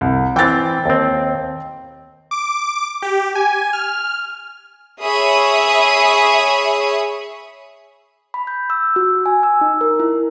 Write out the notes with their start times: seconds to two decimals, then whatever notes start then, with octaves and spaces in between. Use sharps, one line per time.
0.01 C2
0.36 E3 C4 G5 A6
0.86 D#2 C4
2.31 D6
3.02 G4
3.35 G#5
3.73 F6
5.03 G#4 C#5 E5 B5 C#6 D#6
8.34 B5
8.47 G6
8.70 E6
8.96 F#4
9.26 G#5
9.43 E6
9.61 D#4
9.81 A#4
10.00 E4